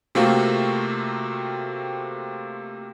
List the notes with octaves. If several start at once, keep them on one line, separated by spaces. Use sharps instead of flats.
C3 A3 A#3 C4 F4 F#4